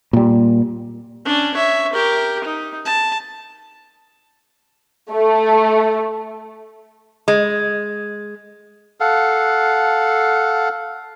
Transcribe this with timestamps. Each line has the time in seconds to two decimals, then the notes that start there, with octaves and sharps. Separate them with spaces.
0.13 A#2 G3
1.26 C#4 D4
1.54 C#5 E5
1.93 G4 A#4
2.44 D#4
2.86 A5
5.11 A3
7.28 G#3
9.00 A4 F5 F#5